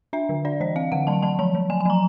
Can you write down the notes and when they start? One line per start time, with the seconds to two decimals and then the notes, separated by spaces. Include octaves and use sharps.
0.13 D4 E5
0.29 D3
0.45 D4 D5
0.60 E3 D#5
0.76 C4 F5
0.92 D3 F#5
1.07 F#3 A5
1.23 F#3 A5
1.39 F3 A5
1.54 F3
1.70 F#3 G#5
1.81 G#5
1.85 F#3 A#5